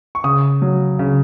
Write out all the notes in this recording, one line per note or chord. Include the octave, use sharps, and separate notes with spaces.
C#6
C#3 D#6
F#3
C#3